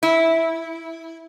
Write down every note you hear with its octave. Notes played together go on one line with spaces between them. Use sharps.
E4